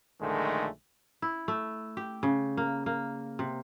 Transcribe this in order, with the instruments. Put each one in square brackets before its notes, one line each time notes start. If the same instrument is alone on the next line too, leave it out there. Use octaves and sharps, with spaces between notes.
[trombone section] A#1 D3 D#3 G#3 A3
[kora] E4
A3
G4
C#3
A#3
A#3
C3